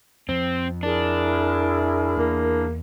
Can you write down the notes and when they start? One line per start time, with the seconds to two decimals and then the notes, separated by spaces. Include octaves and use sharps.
0.29 F2 F3 C4
0.83 D4 E4 G#4 A#4
2.18 E2 A#3